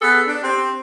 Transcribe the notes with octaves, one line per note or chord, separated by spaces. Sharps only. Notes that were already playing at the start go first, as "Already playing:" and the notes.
B3 G#4 A4
D4
C4 G4